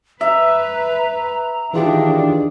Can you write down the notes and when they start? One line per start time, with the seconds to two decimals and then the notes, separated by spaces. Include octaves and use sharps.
0.21 B4 E5 A#5
1.74 D#3 E3 D4 F4 G4 G#4